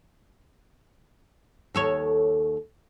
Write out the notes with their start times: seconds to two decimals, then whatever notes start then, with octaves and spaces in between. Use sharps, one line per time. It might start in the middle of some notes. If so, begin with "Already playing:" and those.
1.75 D#2 A4 C#5